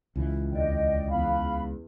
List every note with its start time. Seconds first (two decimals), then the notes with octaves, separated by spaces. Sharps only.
0.16 C#2 E3
0.53 D#2 D3 D5 D#5 G5
1.09 E2 F5 B5